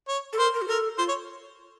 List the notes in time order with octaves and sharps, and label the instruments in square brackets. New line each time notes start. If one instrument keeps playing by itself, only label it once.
[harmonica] C#5
[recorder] A4
[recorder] A#4 [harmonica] C5
[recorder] A#4
F#4
[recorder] A4 [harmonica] A#4
[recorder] F4 [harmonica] C5
[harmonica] C#5